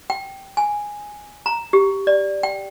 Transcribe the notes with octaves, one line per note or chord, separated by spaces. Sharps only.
G5
G#5
A#5
G4
D5
G5